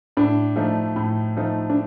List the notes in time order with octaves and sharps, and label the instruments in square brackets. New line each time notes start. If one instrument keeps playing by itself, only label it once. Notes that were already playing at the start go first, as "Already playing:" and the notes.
[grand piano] A2 [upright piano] D4
[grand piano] F3 A3 D#4
A2
F3 A3 D#4
[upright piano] D4